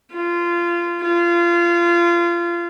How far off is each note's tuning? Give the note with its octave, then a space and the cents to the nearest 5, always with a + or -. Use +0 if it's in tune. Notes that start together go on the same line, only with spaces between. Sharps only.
F4 -20
F4 -25